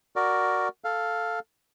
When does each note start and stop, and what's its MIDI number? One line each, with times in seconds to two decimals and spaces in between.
0.16 0.68 66
0.16 0.68 70
0.16 0.68 74
0.84 1.39 69
0.84 1.39 77